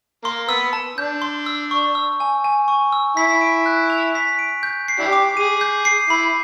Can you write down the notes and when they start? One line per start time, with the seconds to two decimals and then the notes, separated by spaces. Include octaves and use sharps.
0.24 A#3 C6
0.49 B3 E6
0.73 A5
0.98 D4 G6
1.22 C6
1.46 E6
1.71 C#6
1.95 E6
2.20 G#5
2.44 G#5
2.68 C#6
2.92 E6
3.17 E4 B6
3.41 D7
3.66 F#6
3.90 F7
4.15 B6
4.39 D7
4.63 G6
4.88 C7
5.00 D4 E4 G4
5.13 D6
5.37 G#4 D#7
5.61 G6
5.85 C7
6.10 E4 B5